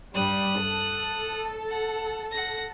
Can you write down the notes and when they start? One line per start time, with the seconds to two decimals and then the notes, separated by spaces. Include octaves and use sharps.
0.14 G2 G3 D#6 F#6
0.62 A4
1.70 F#5
2.31 F#5 A#6